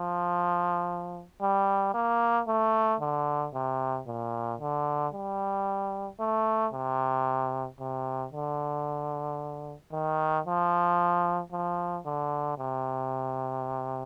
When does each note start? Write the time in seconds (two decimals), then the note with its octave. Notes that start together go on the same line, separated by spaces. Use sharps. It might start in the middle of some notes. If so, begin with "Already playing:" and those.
Already playing: F3
1.41 G3
1.94 A#3
2.47 A3
3.00 D3
3.53 C3
4.07 A#2
4.60 D3
5.13 G3
6.19 A3
6.72 C3
7.79 C3
8.32 D3
9.91 D#3
10.46 F3
11.51 F3
12.05 D3
12.57 C3